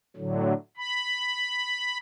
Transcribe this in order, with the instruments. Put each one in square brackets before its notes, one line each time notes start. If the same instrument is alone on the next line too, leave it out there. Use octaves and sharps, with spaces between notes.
[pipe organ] A2 D3 F#3
B5